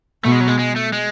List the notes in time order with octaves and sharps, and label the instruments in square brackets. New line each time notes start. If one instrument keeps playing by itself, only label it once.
[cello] B2 [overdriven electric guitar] A3
[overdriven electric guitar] G#3
F#3
G#3
G#3
A3
G#3